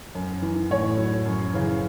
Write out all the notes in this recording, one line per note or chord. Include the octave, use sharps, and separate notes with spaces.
F#2
E3
A2 C#5
F#3
F#2
C#3 E3